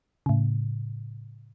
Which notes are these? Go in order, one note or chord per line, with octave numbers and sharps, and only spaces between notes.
A2 C#3